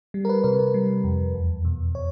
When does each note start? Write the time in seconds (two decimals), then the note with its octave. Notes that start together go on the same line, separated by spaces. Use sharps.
0.14 G3
0.25 A#4
0.29 B4
0.44 C3 B4
0.59 A#4
0.74 G3
1.04 F2
1.35 E2
1.65 B2
1.95 C#5